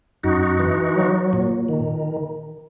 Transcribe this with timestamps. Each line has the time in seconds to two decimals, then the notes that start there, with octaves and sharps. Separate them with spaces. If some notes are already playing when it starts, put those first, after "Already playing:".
0.23 F#2 D#4 F#4
0.59 E3
0.96 F#3
1.33 A#2
1.68 D#3